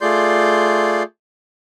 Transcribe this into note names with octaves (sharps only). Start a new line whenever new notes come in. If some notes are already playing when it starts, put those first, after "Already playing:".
A3 F4 G#4 D5 C6 G6